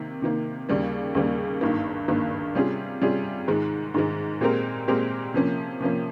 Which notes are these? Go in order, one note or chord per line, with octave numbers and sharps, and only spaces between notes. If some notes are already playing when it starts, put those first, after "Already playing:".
Already playing: C3 D#3 A#3
C3 D#3 A#3
D#2 C#3 G3 A#3
D#2 C#3 G3 A#3
G#1 G2 D#3 A#3
G#1 G2 D#3 A#3
C3 G3 C#4 F4 G#4
C3 G3 C#4 F4 G#4
G#2 D#3 G#3
G#2 D#3 G#3
A#2 G#3 C4 G4 A#4
A#2 G#3 C4 G4 A#4
C3 F3 A#3 C#4
C3 F3 A#3 C#4